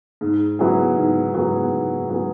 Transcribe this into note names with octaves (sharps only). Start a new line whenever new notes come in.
G#2
F#3 B3 E4 G#4
G#2
F#3 B3 E4 G#4
G#2
F#3 B3 E4 G#4